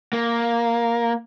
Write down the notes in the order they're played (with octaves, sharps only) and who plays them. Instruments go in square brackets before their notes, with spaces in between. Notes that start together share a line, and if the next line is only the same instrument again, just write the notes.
[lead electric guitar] A#3